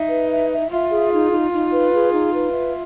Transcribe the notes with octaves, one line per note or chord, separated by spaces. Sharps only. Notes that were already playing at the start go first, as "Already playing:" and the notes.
Already playing: D#4 E5
B4
E5
E5
F4 E5
G#4
D#4
D#4
D#4
B4
G#4
D#4
B4
E5